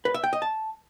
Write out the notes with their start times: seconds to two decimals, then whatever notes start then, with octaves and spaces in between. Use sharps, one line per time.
0.05 B4
0.14 E5
0.24 G5
0.33 D#5
0.42 A5